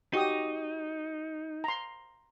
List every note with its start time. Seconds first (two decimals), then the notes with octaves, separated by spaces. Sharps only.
0.13 D#4 F#4 G4 D#6
1.64 A#5 C6